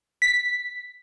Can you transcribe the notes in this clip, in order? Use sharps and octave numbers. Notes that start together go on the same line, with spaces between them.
B6